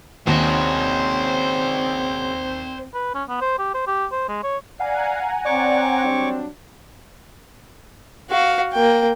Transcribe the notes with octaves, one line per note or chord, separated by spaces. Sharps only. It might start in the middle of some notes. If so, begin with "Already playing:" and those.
D#2 G#2 C#3 C4 F#4 C5 D5
B4
C#4
B3
C5
G4
C5
G4
C5
G#3
C#5
D5 F5 F#5 G#5 A#5
C4 C#5 D5 C#6 D6
F#3 G3 D4
F#4 F5
A#3 G5